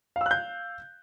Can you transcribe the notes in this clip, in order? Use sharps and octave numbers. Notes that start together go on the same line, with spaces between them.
F5 E6 F#6 G6